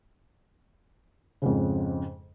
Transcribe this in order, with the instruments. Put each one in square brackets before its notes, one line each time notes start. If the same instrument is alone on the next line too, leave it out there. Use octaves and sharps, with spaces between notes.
[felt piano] F2 G#2 C#3